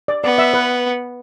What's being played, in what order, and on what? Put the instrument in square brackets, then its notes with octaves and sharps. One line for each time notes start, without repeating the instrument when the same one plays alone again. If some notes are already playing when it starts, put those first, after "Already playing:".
[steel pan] D5
[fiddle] B3 [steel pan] D5
[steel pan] E5
B4